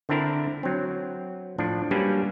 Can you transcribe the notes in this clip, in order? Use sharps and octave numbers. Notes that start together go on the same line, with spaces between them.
D3 C4 D4 E4 A#4
F#3 C4
A2 F3 D4
F#3 G3 A#3 C#4 D4 B4